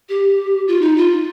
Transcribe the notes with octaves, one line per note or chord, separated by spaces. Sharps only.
G4
F4
D#4
F4